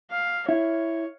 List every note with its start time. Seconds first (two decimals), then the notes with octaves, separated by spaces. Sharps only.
0.11 F5
0.49 E4 C#5